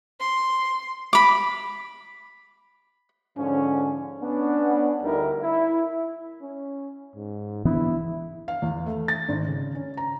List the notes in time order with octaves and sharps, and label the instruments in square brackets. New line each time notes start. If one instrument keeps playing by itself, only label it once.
[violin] C6
[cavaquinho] B5 D6
[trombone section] G#2 D3 F3 C#4
B3 C#4 D4
D2 D3 G3 D#4 E4 A#4
E4
[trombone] C#4
G#2
[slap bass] E3 B3 D4 [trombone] E4
[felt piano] F5
E2
A3
A6
G#1
C#3
C#4
A#5